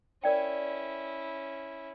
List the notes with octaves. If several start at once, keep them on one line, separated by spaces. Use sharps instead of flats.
C#4 E4 A#4 D5 G5